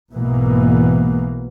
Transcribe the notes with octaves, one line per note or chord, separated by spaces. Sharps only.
B1 G#2 B2 E3 A#3